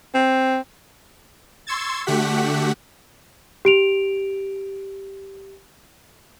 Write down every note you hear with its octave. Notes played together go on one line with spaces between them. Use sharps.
C4
C6 C#6 E6 G#6 A6
D3 A3 F#4 G4 F#5 B6
G4 D7 F7